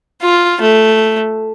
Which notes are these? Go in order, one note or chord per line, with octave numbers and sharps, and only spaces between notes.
F4
A3